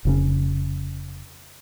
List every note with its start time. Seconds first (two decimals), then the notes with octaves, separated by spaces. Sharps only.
0.05 F1 C#3 C#4